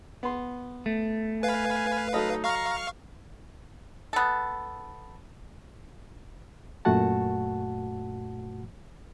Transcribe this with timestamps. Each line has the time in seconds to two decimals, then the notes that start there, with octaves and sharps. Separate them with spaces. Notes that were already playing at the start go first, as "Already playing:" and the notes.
0.23 B3 C6
0.86 A3
1.43 B4 F5 G#5
2.14 F#3 D#4 A4 D#5
2.44 F5 A#5 C#6 F6
4.13 B3 A4
6.85 F#2 A#2 A3 F#4 F#5 A5